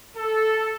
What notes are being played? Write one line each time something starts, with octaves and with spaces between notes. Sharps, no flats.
A4